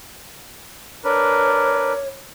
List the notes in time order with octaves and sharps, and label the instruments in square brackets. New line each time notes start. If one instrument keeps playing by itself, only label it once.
[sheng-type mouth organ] D4 A#4 B4 [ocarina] C#5